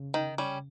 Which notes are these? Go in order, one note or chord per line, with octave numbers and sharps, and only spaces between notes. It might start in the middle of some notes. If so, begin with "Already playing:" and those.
Already playing: C#3
D#3
G3 C#4